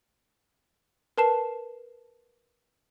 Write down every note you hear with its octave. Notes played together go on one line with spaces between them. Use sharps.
A#4 B4 A5 C7 E7